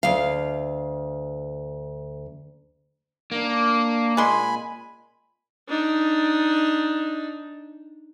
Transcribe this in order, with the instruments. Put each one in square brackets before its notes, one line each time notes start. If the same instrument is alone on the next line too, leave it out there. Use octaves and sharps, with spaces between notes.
[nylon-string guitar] D2 F5
[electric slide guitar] A#3 [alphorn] D4
[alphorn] A#2 [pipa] G#3 C6 [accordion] G#5 B5
[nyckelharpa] D4 D#4